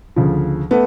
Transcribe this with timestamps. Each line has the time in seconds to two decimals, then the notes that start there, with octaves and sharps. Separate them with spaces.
0.16 D2 C#3 F3
0.71 A3 B3